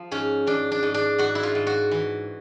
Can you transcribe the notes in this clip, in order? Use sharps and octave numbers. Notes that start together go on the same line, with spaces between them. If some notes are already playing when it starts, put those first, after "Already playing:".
Already playing: F3
G#2 C#4
G#2 D4
D4
G#2
D4
G#2 F#4
E4
F4
G#2
F#4
E3